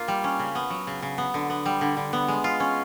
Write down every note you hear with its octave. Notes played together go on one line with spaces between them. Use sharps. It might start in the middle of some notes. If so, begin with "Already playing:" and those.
Already playing: A#3 F4
G3
C#4
C#3
B3
F#3
C#3
C#3
B3
D3
B3
G3
D3
D3
B3
G#3
F4
C#4